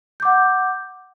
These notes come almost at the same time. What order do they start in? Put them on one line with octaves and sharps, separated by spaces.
G6 D6 F#5